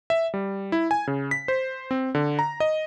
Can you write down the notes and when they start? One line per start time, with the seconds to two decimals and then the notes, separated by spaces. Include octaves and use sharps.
0.10 E5
0.34 G3
0.72 E4
0.91 G#5
1.07 C#3
1.31 B6
1.48 C5
1.91 C4
2.15 D3
2.39 A#5
2.60 D#5